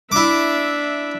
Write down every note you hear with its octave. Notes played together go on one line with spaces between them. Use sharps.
D4 E4 E5 D6